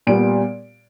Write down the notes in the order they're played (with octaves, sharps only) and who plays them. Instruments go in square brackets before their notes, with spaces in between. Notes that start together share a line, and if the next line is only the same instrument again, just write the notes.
[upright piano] A#2 G3 B3 D7